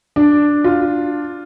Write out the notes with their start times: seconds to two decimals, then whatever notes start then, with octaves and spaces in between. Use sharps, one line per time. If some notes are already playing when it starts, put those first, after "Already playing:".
0.16 D4
0.64 F4